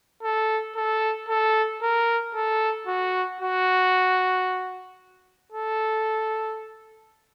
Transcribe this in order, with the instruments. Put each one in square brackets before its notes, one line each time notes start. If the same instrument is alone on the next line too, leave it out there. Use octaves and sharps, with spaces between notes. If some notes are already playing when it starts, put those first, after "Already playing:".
[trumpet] A4
A4
A4
A#4
A4
F#4
F#4
A4